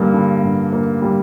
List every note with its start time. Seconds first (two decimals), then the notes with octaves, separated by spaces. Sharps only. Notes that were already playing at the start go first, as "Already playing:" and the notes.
Already playing: G2 D3 G3 A#3
0.13 D3
0.43 G2
0.73 A#3
1.02 G3